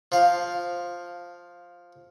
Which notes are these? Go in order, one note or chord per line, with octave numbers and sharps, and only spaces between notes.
F3 F5